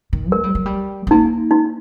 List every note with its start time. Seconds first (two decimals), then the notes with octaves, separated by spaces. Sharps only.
0.13 D#3
0.32 A3 A#4
0.44 G3
0.55 F#3
0.66 G3
1.07 C4
1.11 A#3 D#4
1.51 D#4